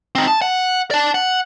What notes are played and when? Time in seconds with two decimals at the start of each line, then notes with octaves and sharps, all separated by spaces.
0.15 C4 D#4
0.28 A5
0.42 F#5
0.91 D5 A5
1.14 F#5